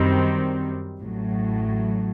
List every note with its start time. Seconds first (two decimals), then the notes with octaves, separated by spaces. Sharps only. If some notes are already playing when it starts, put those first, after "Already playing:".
Already playing: F#2 D#3 G3 C4
0.99 A1 A2 F#3